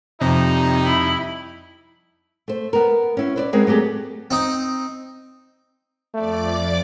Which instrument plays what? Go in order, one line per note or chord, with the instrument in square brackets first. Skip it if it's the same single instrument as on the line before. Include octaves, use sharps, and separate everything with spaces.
[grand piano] F2 [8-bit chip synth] C3 [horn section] G3 D#4
[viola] E4 B5
[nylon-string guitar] A3 C5
B3 A#4
C#4 E4
B4 C5 D5
G#3 B3 C4 G#4 A#4
F#3 A3 G4 G#4
[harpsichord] C4 D#4
[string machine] F2 D5 D6 [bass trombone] A3